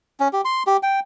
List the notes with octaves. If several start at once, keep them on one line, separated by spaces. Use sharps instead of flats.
C#4
G4
C6
G4
G5